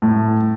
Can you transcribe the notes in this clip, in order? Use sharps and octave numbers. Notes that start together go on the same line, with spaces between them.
A2